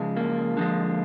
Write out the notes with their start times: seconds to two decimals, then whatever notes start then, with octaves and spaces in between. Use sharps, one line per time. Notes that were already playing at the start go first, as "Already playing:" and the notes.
Already playing: C#3 F3 G#3
0.17 A#3
0.57 D3 F3 G#3